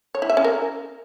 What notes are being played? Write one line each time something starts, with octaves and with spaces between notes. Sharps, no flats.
C#5
E4
E5
C#4
A#4